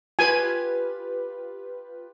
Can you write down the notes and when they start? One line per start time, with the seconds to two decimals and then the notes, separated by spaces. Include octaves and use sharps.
0.19 F4 G4 B4 G#5